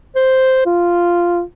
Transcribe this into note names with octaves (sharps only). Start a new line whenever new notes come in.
C5
F4